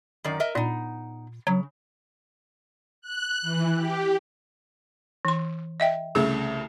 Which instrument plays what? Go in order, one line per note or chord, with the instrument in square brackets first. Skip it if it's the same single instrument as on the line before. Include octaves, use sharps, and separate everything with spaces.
[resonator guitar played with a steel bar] F#2 D#3 D5
A#4 D#5 E5
[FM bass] A#2 [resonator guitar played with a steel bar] B3 D#4
[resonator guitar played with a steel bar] C#3 [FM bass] F#3
[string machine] F#6
E3
G4
[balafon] E3 C6
D#5 E5 G5
[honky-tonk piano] C2 C#3 A3 [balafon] G#4